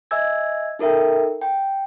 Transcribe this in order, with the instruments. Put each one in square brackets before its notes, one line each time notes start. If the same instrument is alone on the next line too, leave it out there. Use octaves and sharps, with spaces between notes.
[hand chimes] D#5 E5 G#5 E6 G#6
D#4 A4 A#4 E5 G5
G5